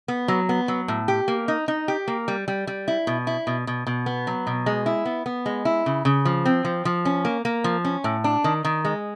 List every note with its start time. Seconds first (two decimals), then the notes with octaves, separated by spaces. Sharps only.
0.08 B3
0.28 F#3
0.49 B3
0.68 F#3
0.88 A2
1.08 G4
1.28 A#3
1.48 D#4
1.68 D#4
1.88 G4
2.08 A#3
2.28 G3
2.48 G3
2.67 G3
2.88 E4
3.07 B2
3.27 E4
3.47 B2
3.67 B2
3.87 B2
4.06 B3
4.27 F#3
4.47 B2
4.66 G#3
4.86 E4
5.05 B3
5.26 B3
5.46 G#3
5.65 E4
5.86 C#3
6.05 C#3
6.25 F3
6.45 C4
6.65 F3
6.85 F3
7.05 C#4
7.25 A#3
7.45 A#3
7.64 F3
7.85 C#4
8.04 A2
8.24 D4
8.44 D#3
8.65 D#3
8.85 G#3